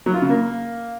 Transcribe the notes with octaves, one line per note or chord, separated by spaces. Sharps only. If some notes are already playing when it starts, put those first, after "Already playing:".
F#3
F4
C#3
A#3